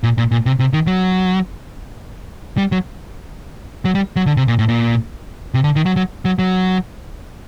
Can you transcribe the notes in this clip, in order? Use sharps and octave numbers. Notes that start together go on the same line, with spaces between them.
A#2
A#2
A#2
C3
C3
D#3
F#3
G3
F#3
F#3
G3
F#3
D3
C3
A#2
A2
A#2
C3
D3
D#3
F#3
F#3
F#3
F#3